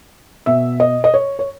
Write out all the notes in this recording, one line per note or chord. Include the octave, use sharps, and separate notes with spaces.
B2 E5
D#5
D#5
C#5
C#5